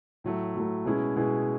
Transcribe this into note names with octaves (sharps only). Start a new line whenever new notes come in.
A2 F#3 A3
A2 F#3 A3
B2 G#3 C#4 E4 G#4
B2 G#3 C#4 E4 G#4